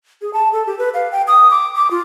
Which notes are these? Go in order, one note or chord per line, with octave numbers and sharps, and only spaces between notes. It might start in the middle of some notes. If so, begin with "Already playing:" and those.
G#4
A5
A4
G4
B4
F5
G5
D#6
D6
D6
F4